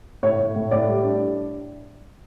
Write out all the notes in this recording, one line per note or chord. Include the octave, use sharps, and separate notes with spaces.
A2 C#5
A2
A2
A2 D5
G3
D4